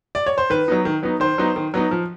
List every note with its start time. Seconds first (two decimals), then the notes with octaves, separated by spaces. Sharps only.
0.15 D5
0.26 C#5
0.38 C5
0.50 D#3 B4
0.68 F#3 B3 D#4
0.85 D#3
1.03 F#3 B3 D#4
1.20 D#3 C5
1.38 F#3 B3 D#4
1.56 D#3
1.74 F#3 B3 D#4
1.91 F3